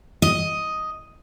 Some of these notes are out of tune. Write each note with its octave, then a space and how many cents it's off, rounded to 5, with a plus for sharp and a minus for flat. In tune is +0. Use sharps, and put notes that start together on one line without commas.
D#5 +5